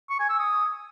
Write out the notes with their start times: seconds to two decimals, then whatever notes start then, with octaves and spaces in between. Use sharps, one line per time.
0.10 C#6
0.20 G#5
0.30 E6
0.39 D#6